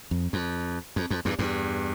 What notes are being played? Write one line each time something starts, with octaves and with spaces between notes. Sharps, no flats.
F2
F2
F2
F2
E2 G2
E2 G2